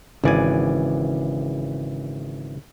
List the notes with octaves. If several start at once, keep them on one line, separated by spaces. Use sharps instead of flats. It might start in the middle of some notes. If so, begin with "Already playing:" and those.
G#1 C#3 E3 D5 G#5